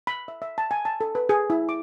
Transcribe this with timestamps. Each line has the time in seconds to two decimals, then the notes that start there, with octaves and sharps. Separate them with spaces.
0.07 B5
0.28 E5
0.42 E5
0.58 A5
0.71 G#5
0.85 A5
1.01 A4
1.15 B4
1.29 G#4
1.50 E4
1.69 D6